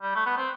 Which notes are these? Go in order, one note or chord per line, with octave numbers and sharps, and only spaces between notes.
G3
A3
B3
C4